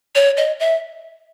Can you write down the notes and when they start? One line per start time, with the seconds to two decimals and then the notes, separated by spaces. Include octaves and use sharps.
0.15 C#5
0.37 D#5
0.60 E5